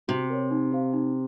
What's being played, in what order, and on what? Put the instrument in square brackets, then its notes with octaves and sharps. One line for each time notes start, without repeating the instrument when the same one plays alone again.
[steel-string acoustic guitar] C3 [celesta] F#4
[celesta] A#4 C#5
D#4
G4 C5 F5
D#4